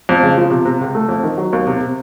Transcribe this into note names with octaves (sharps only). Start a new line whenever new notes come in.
F2
C#3
F3
C3
C3
C#2
A3
F2
D#3
F#3
D#2
C3
C3